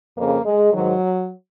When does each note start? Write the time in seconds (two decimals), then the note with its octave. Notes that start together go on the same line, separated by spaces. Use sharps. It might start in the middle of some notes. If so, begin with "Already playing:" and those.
0.17 F2 C#3 A#3
0.45 G#3
0.73 G#2 D#3 F#3